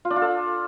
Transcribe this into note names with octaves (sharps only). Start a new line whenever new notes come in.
F4
D4
F4
A4